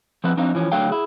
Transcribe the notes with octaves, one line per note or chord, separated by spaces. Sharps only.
F3 B3 C4 E4 B4
F3 C4 D4 D#4 C5 F5
E3 F3 C#4
D2 D3 F#3 A3 F5 G5
E4 G#4